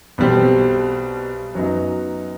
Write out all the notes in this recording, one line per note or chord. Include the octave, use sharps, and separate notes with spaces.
B1 B2 G3 C4
F#2 F#3 B3 D#4